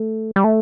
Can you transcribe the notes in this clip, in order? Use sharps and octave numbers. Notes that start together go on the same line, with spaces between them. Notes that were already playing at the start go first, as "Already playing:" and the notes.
Already playing: A3
G3
A3